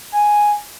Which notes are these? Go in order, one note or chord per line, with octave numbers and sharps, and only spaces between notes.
G#5